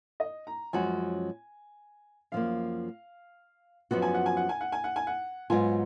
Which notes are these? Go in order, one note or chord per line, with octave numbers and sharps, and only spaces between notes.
D#5
A#5
F#2 F3 G#3 C#4 F#4 G#5
F#2 F3 A#3 F5
F#2 F3 B3 F#4 F#5
G#5
F#5
G#5
F#5
G#5
F#5
G#5
F#5
G#5
F#5
G#2 F#3 B3 F4 G#5